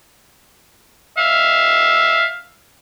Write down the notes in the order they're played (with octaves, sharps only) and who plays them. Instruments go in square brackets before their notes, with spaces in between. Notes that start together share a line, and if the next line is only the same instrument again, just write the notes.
[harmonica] E5 F5